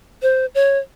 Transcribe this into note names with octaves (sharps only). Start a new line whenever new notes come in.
C5
C#5